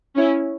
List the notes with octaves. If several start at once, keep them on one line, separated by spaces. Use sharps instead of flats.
C#4 E4